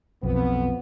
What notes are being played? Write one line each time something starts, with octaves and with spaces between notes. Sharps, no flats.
B1 F2 F3 B3